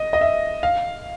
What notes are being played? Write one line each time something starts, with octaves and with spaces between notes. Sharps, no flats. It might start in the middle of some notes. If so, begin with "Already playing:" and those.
Already playing: D#5
D#5
E5
F5